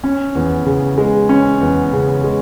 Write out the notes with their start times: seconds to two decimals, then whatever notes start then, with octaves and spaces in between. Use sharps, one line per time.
0.04 C#4
0.35 E2
0.66 C#3
0.98 G#3
1.29 C#4
1.61 E2
1.93 C#3
2.24 G#3